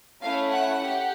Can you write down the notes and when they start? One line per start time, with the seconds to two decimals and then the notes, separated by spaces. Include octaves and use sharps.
0.22 A3 C#4 E4 F5
0.53 F#5
0.83 G4